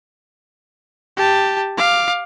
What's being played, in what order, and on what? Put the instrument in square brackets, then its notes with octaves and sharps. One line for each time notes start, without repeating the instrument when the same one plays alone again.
[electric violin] G4 A5
F5 D6